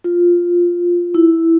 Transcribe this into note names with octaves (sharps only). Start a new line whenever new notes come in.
F4
E4